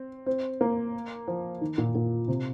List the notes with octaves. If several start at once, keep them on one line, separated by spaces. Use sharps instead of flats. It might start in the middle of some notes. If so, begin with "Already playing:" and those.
Already playing: C4
C4
A#3
F3
D#3
A#2
A#2
C3